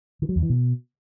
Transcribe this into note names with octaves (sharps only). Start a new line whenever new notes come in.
D#3
F#3
E2
E3
B2